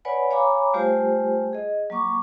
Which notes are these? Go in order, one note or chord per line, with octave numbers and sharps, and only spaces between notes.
B4 C#5 D5 F#5 G#5 B5
C#5 F5 G#5 A#5 B5 D6
G3 A3 F4 G4 C5 G#5
G#4 D#5
F#3 A#3 C#6 D6